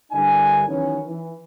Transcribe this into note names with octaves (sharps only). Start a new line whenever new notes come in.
G2 D3 D4 E4 A#4 G#5
D#3 E3 F#3 B3 C#4
E3